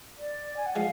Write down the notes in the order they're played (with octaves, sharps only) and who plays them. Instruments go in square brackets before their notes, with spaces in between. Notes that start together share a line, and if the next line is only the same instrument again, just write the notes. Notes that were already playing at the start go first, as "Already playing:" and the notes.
[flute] D5
G#5
F#5
[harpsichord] F3 G#3 [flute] F5